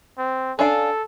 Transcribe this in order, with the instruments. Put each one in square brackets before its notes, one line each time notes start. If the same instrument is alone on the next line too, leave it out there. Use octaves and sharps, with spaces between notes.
[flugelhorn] C4
[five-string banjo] C#4 D4 F5 [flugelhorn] A4